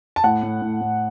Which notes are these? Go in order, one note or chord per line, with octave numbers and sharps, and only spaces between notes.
A5
A2 F#5
A2
A2
A2